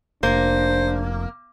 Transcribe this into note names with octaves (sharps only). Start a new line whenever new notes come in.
F1 A#3 D4 C5